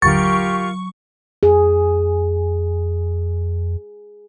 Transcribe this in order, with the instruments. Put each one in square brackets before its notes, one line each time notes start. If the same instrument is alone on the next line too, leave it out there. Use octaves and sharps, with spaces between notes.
[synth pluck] G1 D#2 D3 [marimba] F#3 [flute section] F4 G4 A#4 [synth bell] C#6
[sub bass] F2 [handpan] G#4